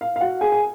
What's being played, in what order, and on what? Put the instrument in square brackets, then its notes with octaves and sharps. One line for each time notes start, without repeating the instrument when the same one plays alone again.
[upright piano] F5
F5
F#4 F#5
G#4 G#5
G#5